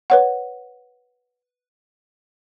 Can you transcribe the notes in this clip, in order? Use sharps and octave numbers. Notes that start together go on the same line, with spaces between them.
B4 C#5 F#5